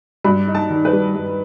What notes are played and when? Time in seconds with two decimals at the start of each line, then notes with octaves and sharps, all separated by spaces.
0.24 G2 B5
0.47 D#4
0.55 A5
0.70 D#3
0.85 B4
0.93 G3
1.16 G2